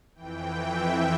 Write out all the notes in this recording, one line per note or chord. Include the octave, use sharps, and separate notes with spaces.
F2 E3 G5
E5